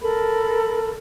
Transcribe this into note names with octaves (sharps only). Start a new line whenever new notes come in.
A4 A#4 B5